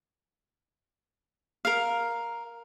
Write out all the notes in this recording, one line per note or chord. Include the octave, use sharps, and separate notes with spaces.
A#4 F5